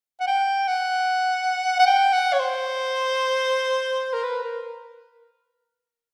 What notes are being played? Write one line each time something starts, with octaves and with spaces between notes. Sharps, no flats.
F#5
G5
F#5
F#5
G5
F#5
C#5
C5
A#4
B4
A#4